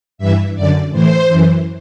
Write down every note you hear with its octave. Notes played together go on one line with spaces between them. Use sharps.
G2 E3 E5
F#2 D3 D5
A2 E3 C5
F#2 E3